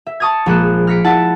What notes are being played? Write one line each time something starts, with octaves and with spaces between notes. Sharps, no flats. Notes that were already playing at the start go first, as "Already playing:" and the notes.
E5
A5 C#6 D#6 F6 G#6
A#1 F3 G#3 A#3 F#6 E7
F6 A#6 B6 C#7 D7
E4 F#5 A5